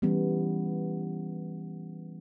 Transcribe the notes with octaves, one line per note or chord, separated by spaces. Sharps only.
E3 G3 B3 C#4